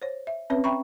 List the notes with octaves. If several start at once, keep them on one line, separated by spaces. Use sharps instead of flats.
C5 C#5
E5
C4 C#4 B4 C#5 E5
E5 G5 A#5 B5 C#6